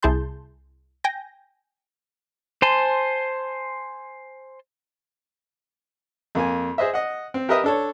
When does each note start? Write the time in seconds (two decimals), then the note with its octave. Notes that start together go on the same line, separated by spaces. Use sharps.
0.03 C2 E4 G#4 A5 C6 G6
1.04 G5 G#5 G6 A#6
2.62 C5 G#5 A5 C6
6.35 F2 A#3 G#5
6.78 G#4 C5 D#5 E5
6.93 D#5 F#5
7.34 C4
7.49 G4 A#4 B4 D#5 E5 D#6
7.64 D4 A4 C#5